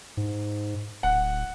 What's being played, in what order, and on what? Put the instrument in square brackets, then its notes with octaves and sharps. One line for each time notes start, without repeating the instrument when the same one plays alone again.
[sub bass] G#2
[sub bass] D1 [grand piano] F#5